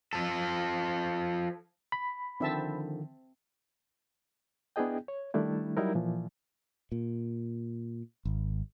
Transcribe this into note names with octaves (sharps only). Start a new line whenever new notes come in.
F3 A4
B5
D3 D#3 F3 C4 E5 A5
B3 D4 E4 G#4 D#5 G5
C#5
D#3 G3 A3 D4 E4
F#3 G3 D#4 E4 A#4
A#2 E3 F3
A#2
G#1